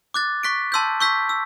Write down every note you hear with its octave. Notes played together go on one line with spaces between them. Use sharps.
D6 F#6 A6
C#6 F#6 B6 D7
A5 C6 E6 G6
C#6 E6 G6 B6
E6